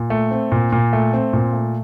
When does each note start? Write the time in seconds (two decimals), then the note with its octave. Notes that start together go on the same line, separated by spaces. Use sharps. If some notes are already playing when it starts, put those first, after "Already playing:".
Already playing: A#2
0.10 A3
0.31 C4
0.52 A#2
0.72 A#2
0.93 A3
1.13 C4
1.33 A#2
1.53 A3